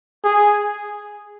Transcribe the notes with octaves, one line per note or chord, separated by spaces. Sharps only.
G#4